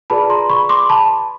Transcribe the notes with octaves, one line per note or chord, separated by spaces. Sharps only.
F4 G#4 B4 D5 A5 B5
A#5 C6
B5 C#6
C6 D6
A5 B5